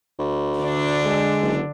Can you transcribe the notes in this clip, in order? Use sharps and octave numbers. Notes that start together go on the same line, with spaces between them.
D2
D3 D4
G#3
F#1